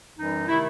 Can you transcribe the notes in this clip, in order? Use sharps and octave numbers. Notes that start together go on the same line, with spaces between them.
F#2 E3 G3 D#4
C3 D#3 A3 E4